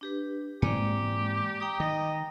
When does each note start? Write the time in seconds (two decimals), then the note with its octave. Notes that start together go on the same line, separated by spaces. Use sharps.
0.01 D4 G4 B4
0.62 G#2 E3 G#3 A#3 C4 G4 D5
1.60 G4 G5 A#5 D#6
1.80 D#3 D#5